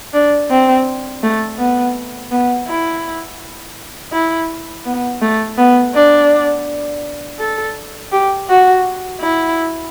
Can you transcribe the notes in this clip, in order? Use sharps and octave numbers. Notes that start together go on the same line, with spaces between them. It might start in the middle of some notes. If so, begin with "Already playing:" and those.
D4
C4
A3
B3
B3
E4
E4
B3
A3
B3
D4
A4
G4
F#4
E4